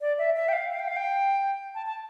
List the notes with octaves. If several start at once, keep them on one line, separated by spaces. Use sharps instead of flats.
D5
E5
E5
G5
F5
F5
G5
F5
G5
A5
A5